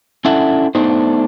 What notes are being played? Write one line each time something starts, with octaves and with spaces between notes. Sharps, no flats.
C#4 D4 E4 A4 E5 F#5
A3 B3 D4 D#4 C5